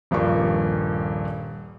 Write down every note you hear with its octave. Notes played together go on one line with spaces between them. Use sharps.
D#1 G2 F3 A#3 C#6